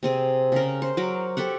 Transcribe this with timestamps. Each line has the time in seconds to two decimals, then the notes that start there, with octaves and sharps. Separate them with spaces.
0.03 C3 C4 G#4
0.52 C#3 A#4
0.82 C5
0.97 F#3 A#4 D6
1.37 G4 A4 E5 F#5